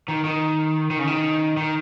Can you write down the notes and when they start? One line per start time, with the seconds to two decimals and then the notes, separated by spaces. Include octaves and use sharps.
0.08 D#3
0.25 D#3
0.90 D#3
0.99 C#3
1.07 D#3
1.57 D#3